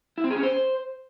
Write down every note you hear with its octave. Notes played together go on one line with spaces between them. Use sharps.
E4
C4
G#4
C#4
C5